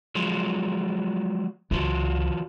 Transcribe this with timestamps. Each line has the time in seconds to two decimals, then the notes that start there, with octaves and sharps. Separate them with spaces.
0.15 F3 F#3 G#3
1.71 C#2 E3 F4 F#4